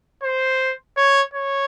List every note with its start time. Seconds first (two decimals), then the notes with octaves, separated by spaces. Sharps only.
0.23 C5
0.97 C#5
1.34 C#5